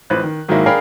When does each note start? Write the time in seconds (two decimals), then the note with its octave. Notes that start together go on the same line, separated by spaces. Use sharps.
0.10 A1 F3 B4 C5 F#6
0.23 D#3
0.48 G#2 D#3 F#3 G#3 A#3 E4
0.66 D4 G#4 A#4 F5 G5 B5